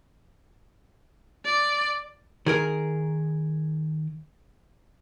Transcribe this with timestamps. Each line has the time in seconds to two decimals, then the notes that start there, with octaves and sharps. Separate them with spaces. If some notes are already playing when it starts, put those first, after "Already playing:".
1.45 D5
2.46 D#3 G#4 A#4